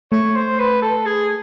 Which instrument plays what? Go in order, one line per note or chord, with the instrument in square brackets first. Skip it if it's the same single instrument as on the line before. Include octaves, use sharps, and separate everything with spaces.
[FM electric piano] A3 [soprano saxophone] C#5
[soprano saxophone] C5
B4
A4
G#4